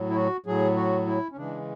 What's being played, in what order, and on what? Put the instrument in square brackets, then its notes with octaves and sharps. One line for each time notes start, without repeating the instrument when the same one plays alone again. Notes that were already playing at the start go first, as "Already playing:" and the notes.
Already playing: [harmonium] A2 F#3
E4
F#4
A2 F#3 G#4
F#4
E4
C#4
C#3 E3 G#3 D4